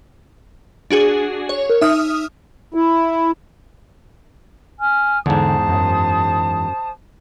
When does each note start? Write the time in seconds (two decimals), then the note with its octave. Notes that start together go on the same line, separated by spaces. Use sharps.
0.91 D4 F#4 G#4
1.49 C#5
1.69 A#4
1.81 D#4 E5 D#6 F6
2.74 E4
4.79 G#5 F6
5.26 E2 G#2 D3 C5 A5 D#6
5.69 F#2